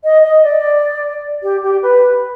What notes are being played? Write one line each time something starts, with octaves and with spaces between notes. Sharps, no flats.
D#5
D#5
D5
G4
G4
B4